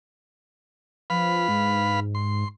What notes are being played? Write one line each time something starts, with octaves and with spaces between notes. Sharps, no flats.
F3 B4 F5 B5
G#2
C6